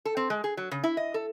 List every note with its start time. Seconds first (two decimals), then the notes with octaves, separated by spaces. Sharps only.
0.05 A4
0.17 C4
0.30 G#3
0.44 G#4
0.57 F#3
0.71 C#3
0.84 E4
0.97 D#5
1.14 A4